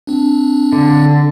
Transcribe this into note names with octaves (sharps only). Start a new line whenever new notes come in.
C4 D4
D3